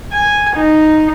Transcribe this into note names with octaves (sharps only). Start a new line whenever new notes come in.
G#5
D#4